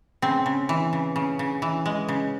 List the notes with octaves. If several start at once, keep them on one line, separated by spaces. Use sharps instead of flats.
C#3 C4
C#3
E3
C#3
C#3
C#3
E3
G#3
C#3